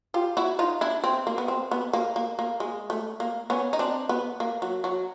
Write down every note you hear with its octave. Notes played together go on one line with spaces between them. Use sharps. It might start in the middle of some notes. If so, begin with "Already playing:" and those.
F4 G4
E4 F#4
D#4 F4
D4 E4
C4
A#3
B3
C4
B3
A#3
A#3
A#3
G#3
A3
A#3
B3 C#4
D#4
C4 D4
B3
A#3
F#3
F#3